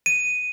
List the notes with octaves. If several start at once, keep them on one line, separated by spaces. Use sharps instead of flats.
D#7